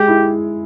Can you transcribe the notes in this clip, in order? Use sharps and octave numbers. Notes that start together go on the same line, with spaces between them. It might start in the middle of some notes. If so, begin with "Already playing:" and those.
Already playing: G#3 G4 G#4
E4